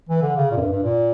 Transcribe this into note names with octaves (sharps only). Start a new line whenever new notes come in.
E3
D3
C#3
A#2
F#2
G2
G2
A#2